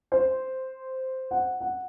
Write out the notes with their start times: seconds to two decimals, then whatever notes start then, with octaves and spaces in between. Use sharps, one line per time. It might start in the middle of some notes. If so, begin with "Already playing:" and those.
0.12 C5
1.31 F#5
1.61 F#5